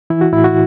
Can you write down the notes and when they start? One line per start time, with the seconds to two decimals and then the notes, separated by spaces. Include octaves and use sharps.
0.10 E3 E4
0.21 F#4
0.33 A2 E4
0.44 F#4